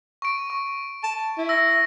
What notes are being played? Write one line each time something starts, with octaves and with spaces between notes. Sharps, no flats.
C#6 D7
C#6
A5
E4
E6 A#6